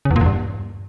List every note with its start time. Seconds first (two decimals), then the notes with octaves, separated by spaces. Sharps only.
0.05 C#3
0.11 E2
0.16 A#2
0.21 E2
0.26 G2